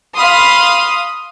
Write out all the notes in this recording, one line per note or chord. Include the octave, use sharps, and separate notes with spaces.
F5 B5 C6 D#6